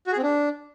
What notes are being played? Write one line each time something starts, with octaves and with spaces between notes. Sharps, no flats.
F#4
G#4
C4
D4